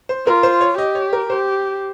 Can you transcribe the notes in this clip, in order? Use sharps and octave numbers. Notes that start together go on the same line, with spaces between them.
C5
F4 A#4
C5
C#5
G4 D#5
C#5
A#4
G4 C5